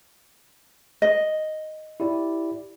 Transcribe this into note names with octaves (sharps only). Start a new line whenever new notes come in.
D#5
E4 G4 D5